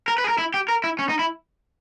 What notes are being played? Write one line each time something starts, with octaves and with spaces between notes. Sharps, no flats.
A#4
B4
G#4
A#4
E4
G4
A#4
E4
C#4
D#4
E4